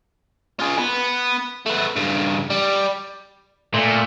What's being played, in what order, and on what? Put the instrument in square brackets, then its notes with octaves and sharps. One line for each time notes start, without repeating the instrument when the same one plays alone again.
[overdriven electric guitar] F4 G#4
B3 B4
A3 B3
G2 C#3
G3
[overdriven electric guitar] A#2 [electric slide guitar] A3